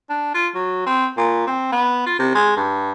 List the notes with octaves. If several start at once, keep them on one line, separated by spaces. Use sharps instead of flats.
D4
F4
F#3
C4
A#2
C4
B3
F4
C3
G#3
G2